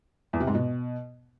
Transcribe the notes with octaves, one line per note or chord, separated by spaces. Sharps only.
E2
C3
G#2
B2